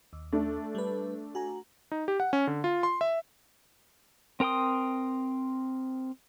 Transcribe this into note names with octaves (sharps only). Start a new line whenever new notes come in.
D#2
A3 D4
G3 B4
F#4 G#5 A#5
D#4
G4
F#5
C#4
D3
F4
C6
E5
C4 A#4 G5 C6 D#6